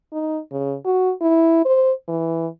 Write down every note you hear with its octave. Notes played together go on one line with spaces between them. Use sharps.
D#4
C#3
F#4
E4
C5
E3